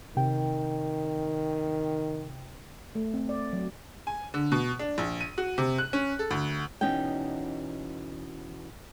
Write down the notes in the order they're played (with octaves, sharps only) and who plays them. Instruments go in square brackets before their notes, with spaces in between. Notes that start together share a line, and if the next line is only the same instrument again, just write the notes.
[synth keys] C3 G5 [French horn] D#3
[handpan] A3
C4
D5
F#3
[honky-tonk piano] G#5
D3
B2
D4
A#1
D#7
F#4
C3
F#6
C#4
A4
D2
[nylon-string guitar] E2 B2 C#4 D#4 G5